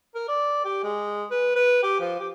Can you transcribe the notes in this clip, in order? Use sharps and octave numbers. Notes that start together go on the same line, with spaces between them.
A#4
D5
G4
G#3
B4
B4
G4
F3
G4